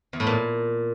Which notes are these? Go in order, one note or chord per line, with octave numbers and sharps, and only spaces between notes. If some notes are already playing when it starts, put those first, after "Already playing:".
E2
A2
A#2